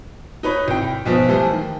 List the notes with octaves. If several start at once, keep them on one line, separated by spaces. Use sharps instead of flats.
D#4 B4 C#5
C2 G5
B1 F3 B3
E3 F3 G3 A3
D#3